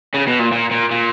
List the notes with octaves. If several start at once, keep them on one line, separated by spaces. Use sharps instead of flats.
C#3
B2
A#2
A#2
A#2
A#2